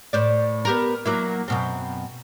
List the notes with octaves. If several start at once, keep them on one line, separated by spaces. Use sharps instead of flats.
A2 C5 D5
B3 G4 A#4
F#3 A#3 E4
F#2 B2 C4